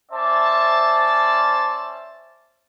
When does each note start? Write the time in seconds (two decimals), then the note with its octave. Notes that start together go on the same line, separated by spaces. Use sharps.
0.12 C#4 C5 D5 E5 A5